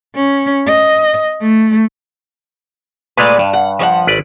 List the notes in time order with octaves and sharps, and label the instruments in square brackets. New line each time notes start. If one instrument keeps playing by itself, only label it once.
[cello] C#4
D#5
A3
[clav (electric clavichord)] A#2 G#3 A3 [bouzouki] B4 D5
[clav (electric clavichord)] G2 [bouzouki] D4
[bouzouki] F#5
F3 C#5 F#5
[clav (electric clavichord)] G#1 B4 D5